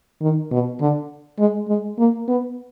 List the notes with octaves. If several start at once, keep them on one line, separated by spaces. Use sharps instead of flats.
D#3
B2
D3
G#3
G#3
A#3
B3